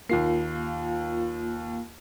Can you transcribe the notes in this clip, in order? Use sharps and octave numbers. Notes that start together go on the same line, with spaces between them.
D#2 A#3 F4 C7